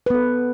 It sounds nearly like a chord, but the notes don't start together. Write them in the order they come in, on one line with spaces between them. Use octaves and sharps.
B4 B3 A4